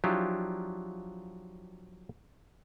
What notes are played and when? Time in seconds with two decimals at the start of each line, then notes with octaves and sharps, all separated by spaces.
0.04 F3 F#3 D4 E4 F4 G4